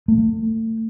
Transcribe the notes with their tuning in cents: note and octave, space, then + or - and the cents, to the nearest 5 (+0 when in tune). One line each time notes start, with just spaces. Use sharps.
A3 +30